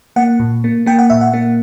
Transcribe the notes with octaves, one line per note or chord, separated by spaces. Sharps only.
A#3 F#5
A#2
A#3
A#3 G5
F#5
A#2 E5
F#5
A#3